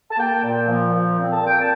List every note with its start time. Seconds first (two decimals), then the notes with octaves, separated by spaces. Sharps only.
0.10 A5
0.18 A#3 G5
0.44 A#2
0.68 F3
0.93 A#2
1.17 C4
1.32 A5
1.43 A#2 G5
1.59 A5